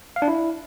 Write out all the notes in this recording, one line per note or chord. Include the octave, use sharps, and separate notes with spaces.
F5
D4
E4